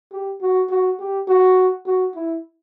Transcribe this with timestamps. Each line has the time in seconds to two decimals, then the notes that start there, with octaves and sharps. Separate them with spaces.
0.12 G4
0.41 F#4
0.70 F#4
0.99 G4
1.28 F#4
1.86 F#4
2.15 E4